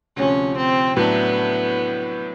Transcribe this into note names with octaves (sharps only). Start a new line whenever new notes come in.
D2 C3 F3 C#4
C4
A2 F#3 A3 B3 D4